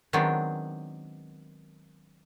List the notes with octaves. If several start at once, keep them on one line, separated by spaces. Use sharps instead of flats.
D#3 F#3 G#3 B3 C4 D4